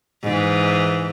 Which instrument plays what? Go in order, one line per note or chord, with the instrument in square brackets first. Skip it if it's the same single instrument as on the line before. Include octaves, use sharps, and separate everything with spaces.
[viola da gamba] G#2 E3